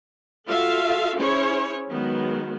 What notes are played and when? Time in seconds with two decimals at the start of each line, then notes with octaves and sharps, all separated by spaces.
0.48 F4 F#4 A4 E5 F5
1.18 C#4 E4 G#4 C5 C#5
1.89 D#3 F#3 G#3 B3